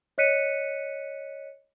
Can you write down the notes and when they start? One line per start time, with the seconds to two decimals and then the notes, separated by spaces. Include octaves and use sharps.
0.18 C#5 D#5 F#6 B6 C#7 D#7